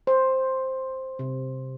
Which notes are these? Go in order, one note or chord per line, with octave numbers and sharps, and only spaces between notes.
C5
C3